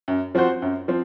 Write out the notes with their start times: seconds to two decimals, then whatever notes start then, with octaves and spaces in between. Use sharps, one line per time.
0.08 F#2
0.35 F3 C4 F#4 C5
0.62 F#2
0.88 F3 C4